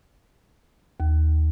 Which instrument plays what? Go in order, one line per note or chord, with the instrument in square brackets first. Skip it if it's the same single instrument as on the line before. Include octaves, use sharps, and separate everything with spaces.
[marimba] D#2